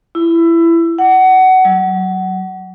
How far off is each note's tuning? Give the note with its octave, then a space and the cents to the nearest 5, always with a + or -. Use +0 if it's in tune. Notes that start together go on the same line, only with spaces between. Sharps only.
E4 +20
F#5 +20
F#3 +20